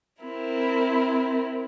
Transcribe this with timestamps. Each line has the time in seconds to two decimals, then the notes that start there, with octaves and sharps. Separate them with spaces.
0.24 C4 E4 A#4